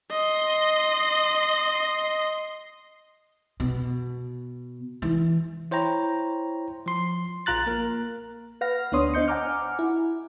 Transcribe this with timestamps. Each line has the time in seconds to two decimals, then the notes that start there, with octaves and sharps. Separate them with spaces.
0.12 D#5 C6
3.60 B2
5.02 E3
5.71 E4 C5 C#5 G5 A#5
6.86 F3 C6
7.46 A#1 F4 A#5 F#6 A6
7.67 A#3 A#4
8.61 B4 F5 F#5 F6 A#6
8.92 D2 B3 D4 C#5 C6 D#6
9.14 D4 C5 D#5 G6 C#7
9.28 F#5 G#5 A#5 D6 F6
9.79 E4